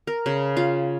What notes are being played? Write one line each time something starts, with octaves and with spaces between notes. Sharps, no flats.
A#4
C#3
F4